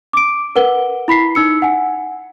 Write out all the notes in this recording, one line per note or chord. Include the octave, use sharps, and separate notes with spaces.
D6 D7
A#4 B4 F#5 G7
E4 B5 B6 C7
D#4 E6 C#7
F#5 G#5